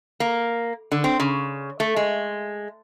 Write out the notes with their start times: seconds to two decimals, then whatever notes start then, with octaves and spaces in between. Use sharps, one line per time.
0.20 A#3
0.92 D3
1.04 C4
1.20 C#3
1.80 A3
1.96 G#3